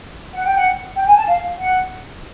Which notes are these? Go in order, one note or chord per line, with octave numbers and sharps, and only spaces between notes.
F#5
G5
F#5
G5
G#5
A5
F5
F#5